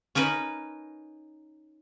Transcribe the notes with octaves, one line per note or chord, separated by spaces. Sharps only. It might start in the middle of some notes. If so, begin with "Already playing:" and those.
C#4 D#4 A#4 B4